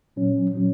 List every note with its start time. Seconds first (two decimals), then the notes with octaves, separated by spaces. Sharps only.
0.16 A#2 F#3 C#4
0.53 A#2 F#3 C#4